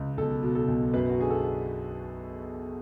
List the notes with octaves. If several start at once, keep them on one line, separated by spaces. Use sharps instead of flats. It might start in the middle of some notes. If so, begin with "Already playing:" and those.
Already playing: C#2
B1 A4
B2
A4
B1
F#2 B4
F#4
D3 G#4
A4